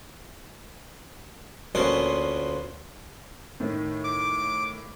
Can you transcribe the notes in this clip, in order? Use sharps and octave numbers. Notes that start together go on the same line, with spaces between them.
D2 A#2 B3 C#4 C5 D#6
A2 D#3
D6